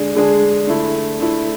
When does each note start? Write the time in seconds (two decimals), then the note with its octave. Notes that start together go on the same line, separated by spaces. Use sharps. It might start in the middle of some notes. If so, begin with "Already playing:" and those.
Already playing: D3 G#3 D4 G#4
0.15 D3 G#3 D4 G#4
0.67 D3 A3 E4
1.19 D3 A3 E4